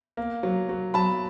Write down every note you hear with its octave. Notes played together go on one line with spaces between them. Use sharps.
A#3
F#3
F#3
F#3 A5 B5